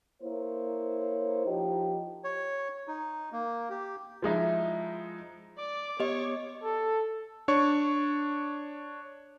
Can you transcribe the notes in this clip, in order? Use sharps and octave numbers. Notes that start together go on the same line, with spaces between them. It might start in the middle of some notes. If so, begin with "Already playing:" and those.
A#3 E4 C5 C#5
F3 D#4 G4
C#5
D#4
A#3
G4
F3 G#3 D#4 E4
D5 D6
B3 G4 C#5 D#5
A4
D4 C#5 C#6